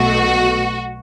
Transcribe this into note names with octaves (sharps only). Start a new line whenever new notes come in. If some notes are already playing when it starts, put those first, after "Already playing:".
Already playing: B1 B2 A3 F#4